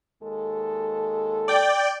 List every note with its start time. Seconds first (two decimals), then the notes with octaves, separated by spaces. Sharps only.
0.22 D#2 G#3 A4
1.48 D5 G5